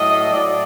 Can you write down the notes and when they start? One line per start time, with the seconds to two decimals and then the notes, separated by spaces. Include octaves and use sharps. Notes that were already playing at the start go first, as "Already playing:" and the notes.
Already playing: A2 F#3 D#5
0.30 A2 F#3 D5